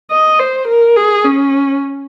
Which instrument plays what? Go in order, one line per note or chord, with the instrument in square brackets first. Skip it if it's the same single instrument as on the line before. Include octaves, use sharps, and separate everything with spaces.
[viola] D#5
C5
A#4
G#4
C#4